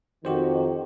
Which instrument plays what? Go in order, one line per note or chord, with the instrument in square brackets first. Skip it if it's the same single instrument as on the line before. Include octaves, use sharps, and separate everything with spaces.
[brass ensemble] F2 D#3 [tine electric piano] F#4 G4 C5